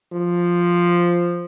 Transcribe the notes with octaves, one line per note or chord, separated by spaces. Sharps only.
F3